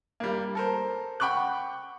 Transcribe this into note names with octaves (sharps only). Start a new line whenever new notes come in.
G3 A#3
A4 A#4 C5
F#5 G5 B5 C#6 D6 F#6